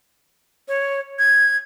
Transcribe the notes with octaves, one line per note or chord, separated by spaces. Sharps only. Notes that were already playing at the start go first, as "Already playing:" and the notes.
C#5
G#6